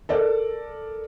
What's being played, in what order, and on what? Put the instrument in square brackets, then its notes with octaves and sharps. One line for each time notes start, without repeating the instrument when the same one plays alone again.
[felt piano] A4 A#4 D5